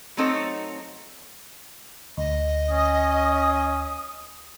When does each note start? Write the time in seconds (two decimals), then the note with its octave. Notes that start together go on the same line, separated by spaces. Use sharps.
0.17 F#3 A3 C4 D#4 A4 C#5
2.17 D2 D#5
2.68 C#4 D#6